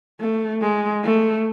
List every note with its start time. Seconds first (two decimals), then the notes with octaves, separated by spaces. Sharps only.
0.20 A3
0.62 G#3
1.04 A3